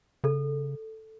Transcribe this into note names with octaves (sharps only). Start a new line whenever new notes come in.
C#3 A4